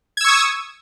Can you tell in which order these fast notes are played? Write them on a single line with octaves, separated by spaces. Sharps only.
G#6 E6 C#6 D#6